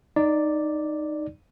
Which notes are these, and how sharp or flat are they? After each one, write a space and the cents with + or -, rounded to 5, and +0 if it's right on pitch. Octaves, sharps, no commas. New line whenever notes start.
D#4 -15 D5 +0